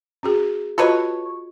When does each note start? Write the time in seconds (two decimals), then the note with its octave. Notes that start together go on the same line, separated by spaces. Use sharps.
0.23 C#4 F#4 G#4
0.78 F4 F#4 A4 B4 C#5 D#5